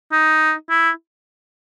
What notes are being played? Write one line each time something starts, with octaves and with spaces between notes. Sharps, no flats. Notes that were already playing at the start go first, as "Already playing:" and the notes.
D#4
E4